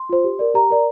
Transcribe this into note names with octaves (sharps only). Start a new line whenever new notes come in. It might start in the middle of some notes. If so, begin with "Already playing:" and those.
Already playing: C6
F4 C5
G4
A#4 D5
G4 A#5
A#4 D5